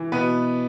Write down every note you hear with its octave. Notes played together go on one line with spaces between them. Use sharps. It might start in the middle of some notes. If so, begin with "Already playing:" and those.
Already playing: E3
B2 B3 B4